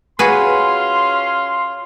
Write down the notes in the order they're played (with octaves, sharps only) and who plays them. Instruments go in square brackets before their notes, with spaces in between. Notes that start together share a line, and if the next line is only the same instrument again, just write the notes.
[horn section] C#4 F4 C6 [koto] F#4 G#4 B4